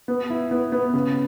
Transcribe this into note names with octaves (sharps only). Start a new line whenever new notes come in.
B3
E4
B3
B3
C#3